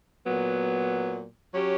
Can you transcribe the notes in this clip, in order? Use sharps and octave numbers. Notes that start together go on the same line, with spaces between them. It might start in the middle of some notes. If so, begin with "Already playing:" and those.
A#2 F#3 B3
F#3 C#4 G4